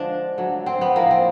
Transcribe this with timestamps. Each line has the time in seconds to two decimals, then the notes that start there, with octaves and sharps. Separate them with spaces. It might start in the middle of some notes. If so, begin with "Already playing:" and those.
Already playing: D3 F3 G#3 D4
0.38 D3 F#3 A3
0.66 C4
0.81 B3
0.95 A2 F3 A3 A#3
1.11 C4